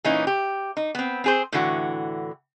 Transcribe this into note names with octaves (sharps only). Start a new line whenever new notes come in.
A#2 E3 A#3 C#4 D#4
G4
D#4
B3 C4
C4 G#4 C5
A2 D3 E3 F#4